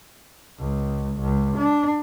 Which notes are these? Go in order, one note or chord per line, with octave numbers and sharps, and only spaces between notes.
C#2
C#2
D4